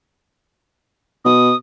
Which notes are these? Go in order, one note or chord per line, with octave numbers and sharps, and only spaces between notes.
B2 D#6